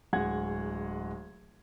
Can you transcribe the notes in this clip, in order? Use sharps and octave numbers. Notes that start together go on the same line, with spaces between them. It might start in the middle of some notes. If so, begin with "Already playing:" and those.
D1 G#3 F#5 G#6